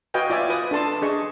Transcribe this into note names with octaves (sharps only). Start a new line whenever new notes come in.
F#4 B4 D#5 F5 G5 G#5
F4 D5 E5 G#5
B4 D#6
D4 A4 A5 C6
D4 G#4 D#5 C#6